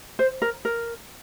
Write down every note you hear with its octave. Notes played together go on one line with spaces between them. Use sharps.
C5
A#4
A#4